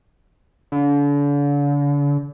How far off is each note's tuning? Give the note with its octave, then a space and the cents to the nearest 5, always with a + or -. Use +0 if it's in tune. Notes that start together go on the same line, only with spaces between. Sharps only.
D3 -40